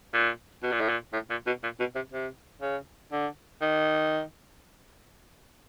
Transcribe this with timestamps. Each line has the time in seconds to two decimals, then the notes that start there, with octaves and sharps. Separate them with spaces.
0.14 A#2
0.63 B2
0.72 A#2
0.80 A2
0.89 A#2
1.13 A2
1.30 A#2
1.47 B2
1.63 A#2
1.80 B2
1.95 C3
2.12 C3
2.61 C#3
3.12 D3
3.61 D#3